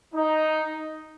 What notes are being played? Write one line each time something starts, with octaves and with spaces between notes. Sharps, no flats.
D#4